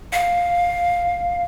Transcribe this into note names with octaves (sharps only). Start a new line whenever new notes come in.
F5